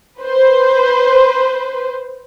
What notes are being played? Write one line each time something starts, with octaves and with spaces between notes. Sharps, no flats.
B4 C5